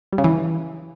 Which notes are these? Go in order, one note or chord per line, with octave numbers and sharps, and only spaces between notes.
G3
C#3
E3